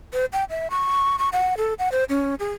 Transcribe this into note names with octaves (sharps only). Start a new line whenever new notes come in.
C5
G5
E5
C#6
C#6
F#5
A4
F#5
C5
C#4
G#4